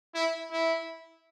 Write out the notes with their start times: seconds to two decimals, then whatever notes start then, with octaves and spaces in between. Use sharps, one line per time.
0.15 E4
0.51 E4